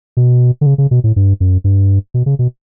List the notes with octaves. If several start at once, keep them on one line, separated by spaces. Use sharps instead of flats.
B2
D3
C#3
C#3
B2
A2
G2
F#2
G2
B2
C#3
B2